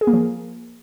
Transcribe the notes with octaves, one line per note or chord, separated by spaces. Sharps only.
G#4
A#3
F3